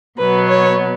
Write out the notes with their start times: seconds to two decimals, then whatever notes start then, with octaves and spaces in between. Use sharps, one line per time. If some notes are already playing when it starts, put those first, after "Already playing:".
0.18 B2 F#3 B3 B4
0.48 C#5